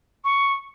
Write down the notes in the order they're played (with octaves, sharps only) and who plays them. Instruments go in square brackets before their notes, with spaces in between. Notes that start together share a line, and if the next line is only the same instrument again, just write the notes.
[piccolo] C#6